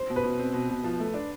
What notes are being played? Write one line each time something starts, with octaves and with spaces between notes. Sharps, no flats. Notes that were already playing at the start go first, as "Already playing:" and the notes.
Already playing: C5
B2
B4
B2
C4
B2
B2
F3
A3
D4